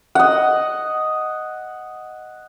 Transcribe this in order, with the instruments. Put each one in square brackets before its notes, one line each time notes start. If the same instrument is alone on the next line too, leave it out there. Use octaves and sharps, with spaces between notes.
[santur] D#5 F#5